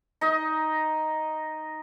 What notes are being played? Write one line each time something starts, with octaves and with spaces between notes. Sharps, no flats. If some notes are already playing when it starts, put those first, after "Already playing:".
D#4 D#5